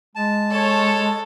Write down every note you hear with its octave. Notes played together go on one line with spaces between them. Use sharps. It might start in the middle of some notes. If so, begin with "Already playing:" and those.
G#3 A5
A4 C#5